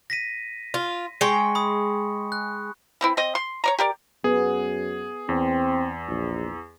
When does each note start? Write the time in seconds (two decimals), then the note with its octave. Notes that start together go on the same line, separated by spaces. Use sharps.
0.10 A#6 B6 D#7
0.74 F4
1.21 G#3 G5 C6 C#6 C#7
1.55 B5 D#6
2.32 F#6
3.01 E3 C4 E4
3.17 C4 D#5
3.35 C6
3.64 C#5 D5 A#5
3.79 G4 A#4 D5
4.24 F#2 B3 G#4
5.29 E2 C4
6.08 A#1